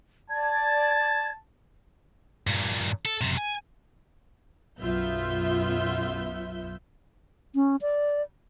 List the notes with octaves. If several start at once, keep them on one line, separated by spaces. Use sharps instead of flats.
D5 A5 G#6
G2 A#2
A4
F#2 C3
G#5
B1 F#2 B3 F4 E5 G6
C#4
D5